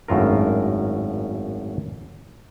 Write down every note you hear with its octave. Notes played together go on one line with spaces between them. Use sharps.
G#1 F#2 A2 F4 A#4